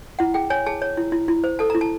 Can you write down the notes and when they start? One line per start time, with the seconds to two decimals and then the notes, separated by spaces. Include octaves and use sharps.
0.19 E4 F#5
0.34 G#4 G5
0.50 C#5 G#5
0.66 G#4 A5
0.82 C#5
0.97 E4
1.12 E4
1.28 E4
1.44 C5
1.59 A4 A5
1.70 E4 A#5
1.81 A5